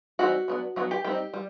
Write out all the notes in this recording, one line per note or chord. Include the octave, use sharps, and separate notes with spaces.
E3 G3 C4 D#4 F#4
F#3 B3 D4
F#3 B3 D4 F#4
G4
G3 C4 D#4 G4
G3